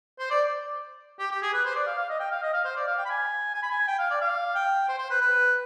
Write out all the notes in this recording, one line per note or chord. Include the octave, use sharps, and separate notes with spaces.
C5
D5
G4
G4
G#4
B4
C5
D5
F5
F5
D#5
G5
F5
D#5
F5
C5
D5
F5
G5
B5
G#5
G#5
B5
G#5
G5
F5
D5
F5
G5
C5
C5
B4
B4